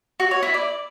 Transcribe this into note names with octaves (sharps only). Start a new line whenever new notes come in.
F#4
C#5
E4
D5